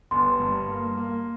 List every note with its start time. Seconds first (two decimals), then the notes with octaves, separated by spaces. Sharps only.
0.11 G1 C6
0.40 G2
0.69 A#3
0.97 A#3